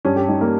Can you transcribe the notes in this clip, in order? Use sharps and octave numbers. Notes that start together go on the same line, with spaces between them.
G2 C#4
G4
G3 D#4
A#3